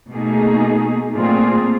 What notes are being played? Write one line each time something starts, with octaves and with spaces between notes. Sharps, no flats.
B2 A3 A#3 D#4 G#4
A#2 A3 C4 F4 G#4